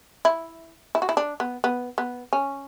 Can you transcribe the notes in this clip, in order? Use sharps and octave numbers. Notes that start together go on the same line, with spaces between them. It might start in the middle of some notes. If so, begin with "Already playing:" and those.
E4
E4
F#4
E4
D4
B3
B3
B3
C#4